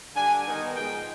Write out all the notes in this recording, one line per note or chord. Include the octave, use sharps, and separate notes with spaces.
D3 G3 D4 G#5
D#3 B3 D#4
G#2 F3 G#3 G5